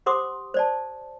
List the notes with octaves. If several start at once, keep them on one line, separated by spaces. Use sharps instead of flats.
G4 C5 F#5 C6 D6 D#6
C5 D5 A5